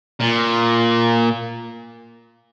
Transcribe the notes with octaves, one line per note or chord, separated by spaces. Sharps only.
A#2